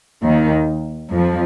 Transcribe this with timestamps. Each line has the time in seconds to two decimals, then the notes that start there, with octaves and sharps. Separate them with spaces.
0.23 D#2 D#3
1.12 F2 F3